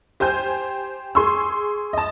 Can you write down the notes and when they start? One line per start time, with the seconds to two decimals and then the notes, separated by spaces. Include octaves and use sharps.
0.20 G4 C5 G#5 G6
1.15 G#4 C6 C#6 E6
1.93 D#5 A5